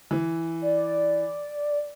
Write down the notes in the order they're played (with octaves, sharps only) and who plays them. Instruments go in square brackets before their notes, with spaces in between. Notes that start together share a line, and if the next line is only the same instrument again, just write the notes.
[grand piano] E3
[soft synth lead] D5